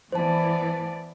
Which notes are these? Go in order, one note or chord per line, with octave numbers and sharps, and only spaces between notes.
E3 B3 C5 D5 A5